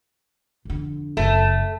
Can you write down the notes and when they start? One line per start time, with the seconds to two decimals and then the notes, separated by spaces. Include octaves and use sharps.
0.65 F2 D3
1.17 F#1 A3